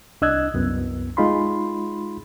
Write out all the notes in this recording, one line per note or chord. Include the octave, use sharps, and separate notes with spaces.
C2 D4 D#5 E6 F#6 G#6
C2 F#2 B3
G#3 D#4 F4 B5 C6